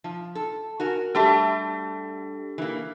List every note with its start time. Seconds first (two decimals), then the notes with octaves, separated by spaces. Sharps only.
0.04 F3
0.35 A4
0.80 F#4 A#4 G#5
1.15 G3 A3 D4 G4 A4 E5
2.58 E3 A#3